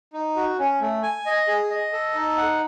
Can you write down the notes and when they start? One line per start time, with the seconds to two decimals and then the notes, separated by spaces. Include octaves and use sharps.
0.13 D#4
0.36 F#4
0.59 C#4
0.81 A3
1.03 G#5
1.26 D#5
1.48 G#4
1.70 D#5
1.93 A4
2.15 D#4
2.37 F#5